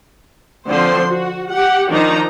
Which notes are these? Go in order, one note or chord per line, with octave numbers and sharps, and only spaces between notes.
D3 F3 C4 C5 C6
F#4
G4 F#5
D#3 F3 D4 D#4 A#5